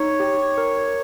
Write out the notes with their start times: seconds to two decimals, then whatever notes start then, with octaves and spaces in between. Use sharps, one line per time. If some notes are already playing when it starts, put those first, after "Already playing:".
Already playing: D#4 C#5
0.20 G4
0.58 A#4